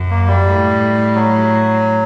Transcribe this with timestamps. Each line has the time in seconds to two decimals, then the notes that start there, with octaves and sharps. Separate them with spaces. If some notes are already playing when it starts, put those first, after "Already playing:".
Already playing: F#2
0.11 A#3
0.27 G3
0.45 A2
1.15 F#3